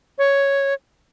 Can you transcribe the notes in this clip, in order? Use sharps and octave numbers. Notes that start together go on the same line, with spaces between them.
C#5